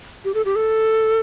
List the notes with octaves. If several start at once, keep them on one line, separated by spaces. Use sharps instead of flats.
G4
A4
G4
A4